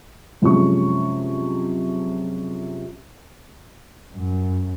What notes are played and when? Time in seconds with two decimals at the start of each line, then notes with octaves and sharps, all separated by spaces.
0.42 F#2 C3 F3 G#3 C#4 C#6
4.12 F#2